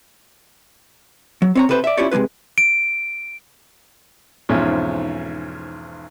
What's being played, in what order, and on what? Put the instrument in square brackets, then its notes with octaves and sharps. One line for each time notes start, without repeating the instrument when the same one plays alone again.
[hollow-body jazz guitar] F#3
C4 C#5 A#5
C3 A4 B4 C5
D5 E5
C#4 E4 F4 G4 C#5 D5
C3 G#3 A#3 F4 B4
[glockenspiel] D7
[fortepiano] B1 E2 G#2 F3 C4 C#4